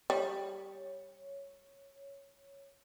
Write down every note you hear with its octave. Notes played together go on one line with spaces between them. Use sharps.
G3 C#5